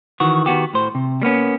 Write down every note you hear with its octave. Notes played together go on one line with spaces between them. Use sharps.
D#3 E3 F#4
D#3 B3 F#4 G4
A2 C5
C3
G3 A#3 B3 C#4